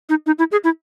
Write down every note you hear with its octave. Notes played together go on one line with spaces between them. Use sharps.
D#4
D#4
E4
G#4
E4